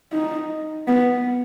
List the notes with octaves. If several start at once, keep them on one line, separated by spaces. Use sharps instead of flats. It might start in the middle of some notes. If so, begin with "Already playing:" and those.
D#4
B3